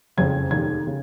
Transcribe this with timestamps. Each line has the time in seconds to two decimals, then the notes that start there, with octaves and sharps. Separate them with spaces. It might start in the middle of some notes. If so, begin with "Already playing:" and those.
0.17 F#1 F2 C#3 G#3 C4 G#6
0.51 F1 D#2 D#3 G#6
0.87 C#3